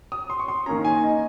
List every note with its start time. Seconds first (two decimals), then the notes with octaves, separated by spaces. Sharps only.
0.12 D#6
0.30 C6
0.39 C#6
0.48 C6
0.66 D#3 A#3 C#4 A#5
0.85 G#5
1.04 D#5